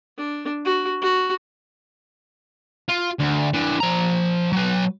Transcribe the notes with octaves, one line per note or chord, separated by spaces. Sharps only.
D4
F#4
F#4
F4
D2
E3 D4
F3 A#5
F#3 B4